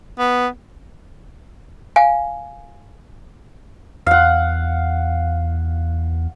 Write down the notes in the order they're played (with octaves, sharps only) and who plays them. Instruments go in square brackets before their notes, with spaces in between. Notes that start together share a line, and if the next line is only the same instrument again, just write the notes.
[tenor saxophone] B3
[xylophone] F5 G#5
[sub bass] E2 [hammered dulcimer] F5 F#5